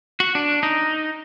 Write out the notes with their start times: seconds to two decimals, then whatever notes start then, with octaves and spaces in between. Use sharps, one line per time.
0.20 F#4
0.35 D4
0.63 D#4